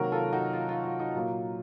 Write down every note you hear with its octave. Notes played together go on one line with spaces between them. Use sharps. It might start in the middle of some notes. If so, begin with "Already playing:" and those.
Already playing: C3 D#3 F#3 A#3 F#4 A#4
F4 A4
D#4 F#4
F4
F4
F4
D#4
A#2 F#3 A#3 F4